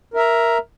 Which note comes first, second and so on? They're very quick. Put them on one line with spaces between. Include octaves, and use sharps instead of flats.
A#4 E5 A#5